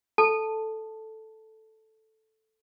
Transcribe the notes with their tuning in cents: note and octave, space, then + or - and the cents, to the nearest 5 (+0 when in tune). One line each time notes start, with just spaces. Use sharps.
A4 -5 A5 +0